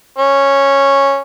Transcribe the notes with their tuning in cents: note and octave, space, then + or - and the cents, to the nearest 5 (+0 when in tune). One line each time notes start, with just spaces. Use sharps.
C#4 -5